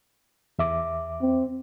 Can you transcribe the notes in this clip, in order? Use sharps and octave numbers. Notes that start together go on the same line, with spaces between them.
E2 E5 D6
C4